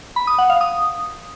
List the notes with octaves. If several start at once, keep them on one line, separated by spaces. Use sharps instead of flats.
B5
D#6
F#5
F5
D#6